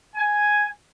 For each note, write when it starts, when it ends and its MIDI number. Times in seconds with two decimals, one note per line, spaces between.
0.16 0.68 80